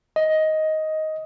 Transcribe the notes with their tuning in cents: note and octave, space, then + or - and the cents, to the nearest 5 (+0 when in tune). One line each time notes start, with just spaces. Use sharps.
D#5 +10